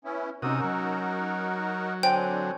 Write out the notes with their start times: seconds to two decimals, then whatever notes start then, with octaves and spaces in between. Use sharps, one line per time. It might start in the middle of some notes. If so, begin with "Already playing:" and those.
0.05 B3 C#4 E4
0.42 C3 C#4 D#4 F#4 A#4 D#6 E6 F#6
0.64 F#3
2.03 D3 C4 D4 C5 C#5 G5 G#5